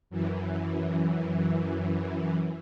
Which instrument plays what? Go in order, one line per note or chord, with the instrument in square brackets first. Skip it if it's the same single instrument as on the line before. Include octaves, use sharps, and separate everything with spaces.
[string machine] F#2 E3